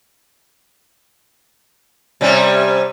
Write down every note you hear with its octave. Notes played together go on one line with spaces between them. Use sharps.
C3 G3 C#4